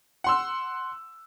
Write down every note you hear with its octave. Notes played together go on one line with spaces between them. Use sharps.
F#5 C6 E6